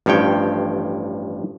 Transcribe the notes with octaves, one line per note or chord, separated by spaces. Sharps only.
A1 G2 F3 C#5 G5